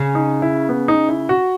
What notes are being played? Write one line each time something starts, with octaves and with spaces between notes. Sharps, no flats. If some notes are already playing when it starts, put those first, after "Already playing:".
Already playing: C#3
D#4
E4
B3
D#4
E4
F#4